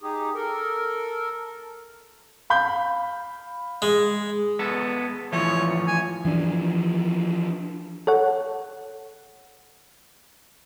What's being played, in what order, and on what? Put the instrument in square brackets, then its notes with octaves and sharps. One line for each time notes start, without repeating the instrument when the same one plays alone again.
[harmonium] D#4 G4 G#4
A4 A#4
[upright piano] F5 B5 G6
[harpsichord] G#3
[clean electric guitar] G#3 B3 A4
[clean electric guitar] E3 F3 A3 [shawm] C#5
[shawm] G#5
[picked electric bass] E3 F3 D4
[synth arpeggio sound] A4 C#5 F#5